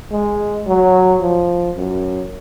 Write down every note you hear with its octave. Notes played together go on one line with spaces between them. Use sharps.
G#3
F#3
F3
F#2